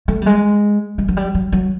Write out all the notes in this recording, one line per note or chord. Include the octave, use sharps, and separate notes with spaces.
A3
G3
G#3
G#3
F#3
G3
F#3
F#3